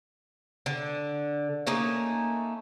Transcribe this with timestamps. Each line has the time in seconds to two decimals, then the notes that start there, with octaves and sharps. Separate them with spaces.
0.66 D3
1.67 A3 A#3 C#4 D#4